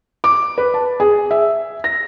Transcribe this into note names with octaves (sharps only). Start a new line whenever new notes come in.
D6
B4
A5
G#4
E5
A#6